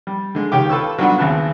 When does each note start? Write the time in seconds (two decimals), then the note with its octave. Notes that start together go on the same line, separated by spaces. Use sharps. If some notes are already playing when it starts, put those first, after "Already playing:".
0.07 G3
0.35 D3 G#3
0.52 C#2 D#3 G4 C#5 G5 D6
0.70 F4 A4 B4 A5 C#6 E6
0.98 F#3 G3 B3 D4 F4 F#4
1.18 G#1 D#2 C#3 B3 A5 F#6